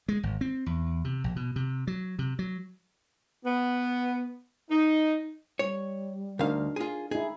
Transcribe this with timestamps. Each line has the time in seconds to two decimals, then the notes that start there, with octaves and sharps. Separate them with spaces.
0.08 G#3
0.23 G#1
0.41 C4
0.66 E2
1.05 C3
1.24 A#1
1.36 B2
1.56 C3
1.87 F#3
2.19 C3
2.39 F#3
3.45 B3
4.70 D#4
5.59 G3 C#5
6.39 D2 D4 D#4 A#4 F5
6.76 F4 G#4
7.11 D#4 E4 G#4